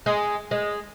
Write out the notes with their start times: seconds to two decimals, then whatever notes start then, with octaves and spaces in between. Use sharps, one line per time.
0.06 G#3
0.51 G#3